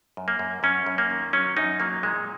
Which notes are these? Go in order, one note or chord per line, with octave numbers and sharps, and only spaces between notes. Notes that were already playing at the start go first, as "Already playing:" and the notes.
F#2
A#3
F#2
F#2 C#4
F#2
A#3
D#3
F#3 C#4
F#2 D#4
F#3 A#3
A#2 G#3